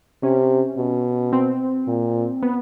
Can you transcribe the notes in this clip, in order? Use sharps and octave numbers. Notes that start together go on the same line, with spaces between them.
C3 C#4
B2
C4
A#2
B3